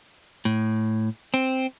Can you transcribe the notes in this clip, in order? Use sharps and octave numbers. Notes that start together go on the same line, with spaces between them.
A2
C4